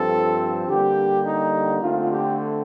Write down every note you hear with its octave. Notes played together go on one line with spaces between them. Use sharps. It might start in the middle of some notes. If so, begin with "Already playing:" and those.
Already playing: G2 F3 C4 A4
D3 G3 A#3 G4
D#4
D3 A3 C4 F4
G4